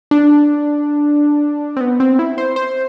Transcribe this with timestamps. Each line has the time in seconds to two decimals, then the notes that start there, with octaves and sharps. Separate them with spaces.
0.11 D4
1.77 C4
1.81 B3
2.00 C4
2.19 E4
2.38 C5
2.56 C5